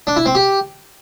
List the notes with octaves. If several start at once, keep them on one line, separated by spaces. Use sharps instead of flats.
D4
E4
C4
G4